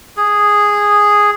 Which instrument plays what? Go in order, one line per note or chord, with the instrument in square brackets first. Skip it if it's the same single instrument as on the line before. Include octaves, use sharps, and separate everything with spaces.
[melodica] G#4